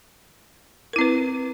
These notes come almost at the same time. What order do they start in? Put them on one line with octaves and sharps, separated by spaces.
A#4 E4 C4 B4